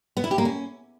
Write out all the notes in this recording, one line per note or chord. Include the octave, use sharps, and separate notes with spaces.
B3
E4
G4
A#3
C#4